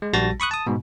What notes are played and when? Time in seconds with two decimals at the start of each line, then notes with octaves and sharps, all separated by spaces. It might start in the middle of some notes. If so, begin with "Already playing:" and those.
0.02 G#3
0.13 A#1 G3 F#4 A5 A6 A#6
0.40 B5 C#6 D#6 F#6
0.51 A5 D#6
0.67 G#2 B2